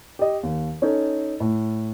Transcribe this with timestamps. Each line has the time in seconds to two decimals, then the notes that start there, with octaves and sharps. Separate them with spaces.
0.19 G4 D#5
0.43 D#2
0.82 C#4 D#4 A4
1.40 A2